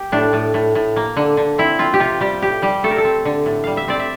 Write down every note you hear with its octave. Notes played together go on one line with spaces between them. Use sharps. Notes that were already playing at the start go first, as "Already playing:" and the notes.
Already playing: G4
A2 D4
A2
A2
A2
A#3
D3
D3
C4 E4
C4 F4
G4
C3 F4
G3 G4
A2 G4
G3 G4
A3 A4
A#4
A4
C4
D3
A2
G3 F5
E5
C4 D5
E5